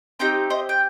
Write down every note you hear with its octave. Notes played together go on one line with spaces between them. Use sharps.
C4 D#4 G4 G5 A#5
C5 D#5
G5